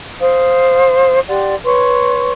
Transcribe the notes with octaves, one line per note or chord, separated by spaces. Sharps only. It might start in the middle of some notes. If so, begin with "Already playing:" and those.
C5 F5 D#6
G4 D5 F#5 C6
B4 C#5 C6 C#6